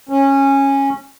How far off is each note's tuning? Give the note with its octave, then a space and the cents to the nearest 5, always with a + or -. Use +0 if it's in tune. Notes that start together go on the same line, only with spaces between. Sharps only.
C#4 -15